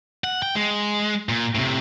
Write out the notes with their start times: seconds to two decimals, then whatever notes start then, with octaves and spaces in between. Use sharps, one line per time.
0.24 F#5
0.42 G5
0.56 G#3
1.29 A#2
1.55 A2 C3